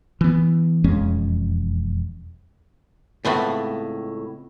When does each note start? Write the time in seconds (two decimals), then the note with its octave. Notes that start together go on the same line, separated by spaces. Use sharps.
0.21 E3 B3
0.84 E1 F2 G#3 C#4
3.25 C#2 A2 A3 B3 C4